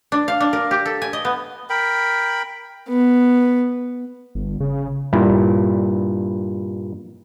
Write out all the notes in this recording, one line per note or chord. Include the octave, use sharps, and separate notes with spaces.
D4
F5
D4
A#4
G4
A4
G#5
D#5
B3
A#4 G5 B5
B3
G1
C#3
G2 A#2 E4